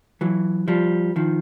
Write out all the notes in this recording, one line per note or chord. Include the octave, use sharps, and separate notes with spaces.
E3 F#3
F3 G3
D#3 F3